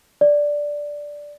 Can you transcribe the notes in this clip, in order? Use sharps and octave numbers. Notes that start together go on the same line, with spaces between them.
D5